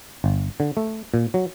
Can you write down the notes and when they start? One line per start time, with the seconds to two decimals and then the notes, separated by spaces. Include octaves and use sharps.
0.24 G1
0.60 D3
0.77 A3
1.14 A#2
1.34 F#3